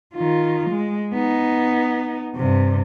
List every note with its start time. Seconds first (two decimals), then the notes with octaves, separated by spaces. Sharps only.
0.15 D#3 F4
0.71 G#3
1.14 B3 D#4
2.36 G2 C3